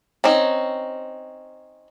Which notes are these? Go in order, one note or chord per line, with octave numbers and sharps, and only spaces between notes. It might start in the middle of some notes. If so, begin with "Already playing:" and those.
C4 C#4 D#4